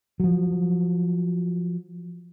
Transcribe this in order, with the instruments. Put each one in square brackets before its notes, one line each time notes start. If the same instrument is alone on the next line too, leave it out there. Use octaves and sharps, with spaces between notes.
[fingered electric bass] F3 F#3